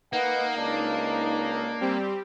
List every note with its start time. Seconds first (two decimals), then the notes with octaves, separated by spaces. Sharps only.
0.13 A#3 D#4 B4 F#5
0.56 C#2 D4
1.80 G3 C4 G4